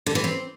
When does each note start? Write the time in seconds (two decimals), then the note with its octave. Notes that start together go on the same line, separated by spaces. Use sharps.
0.06 D3
0.15 E3
0.24 C4